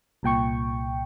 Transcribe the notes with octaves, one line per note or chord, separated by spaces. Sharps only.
C2 A#2 G5 C#6